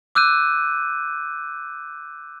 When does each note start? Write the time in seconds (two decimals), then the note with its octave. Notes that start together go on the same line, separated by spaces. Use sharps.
0.15 D6 E6 F#6 G6 D#7